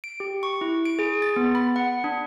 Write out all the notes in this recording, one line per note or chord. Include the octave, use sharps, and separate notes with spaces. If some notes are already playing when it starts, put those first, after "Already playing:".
D7
G4
C#6
E4
D7
G#4
A6
B3
B5
F#5
D4